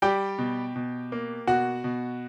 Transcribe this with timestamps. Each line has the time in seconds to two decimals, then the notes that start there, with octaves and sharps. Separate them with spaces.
0.02 G3 G4 G5
0.38 B2
0.76 B2
1.12 A#3
1.47 B2 F#4 F#5
1.84 B2